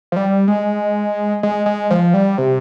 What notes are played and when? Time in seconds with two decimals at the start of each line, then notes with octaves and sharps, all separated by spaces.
0.12 F3
0.16 G3
0.48 G#3
1.43 G#3
1.66 G#3
1.91 F3
2.14 G3
2.38 C3